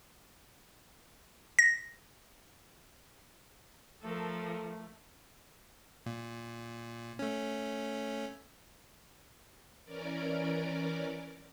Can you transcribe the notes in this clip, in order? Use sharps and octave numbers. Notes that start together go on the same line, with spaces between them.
A#6
F3 A3 A4 A#4
A#2
A3 C#4
E3 C#4 A#4 D5 D6